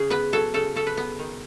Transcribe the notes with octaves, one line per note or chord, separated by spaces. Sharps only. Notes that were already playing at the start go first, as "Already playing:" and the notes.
Already playing: C#3 G#4
B3 B4
F#3 A4
C#3 A4
C#3 A4
B4
B3
D#3